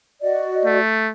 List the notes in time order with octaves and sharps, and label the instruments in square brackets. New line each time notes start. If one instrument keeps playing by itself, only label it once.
[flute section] F#4 D5 D#5
[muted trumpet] A3